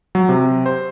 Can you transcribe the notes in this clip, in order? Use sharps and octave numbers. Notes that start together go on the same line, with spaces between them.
F#3
C3
C5